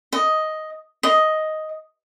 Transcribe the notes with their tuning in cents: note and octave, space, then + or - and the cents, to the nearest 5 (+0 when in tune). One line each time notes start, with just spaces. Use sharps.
D#5 +5
D#5 +5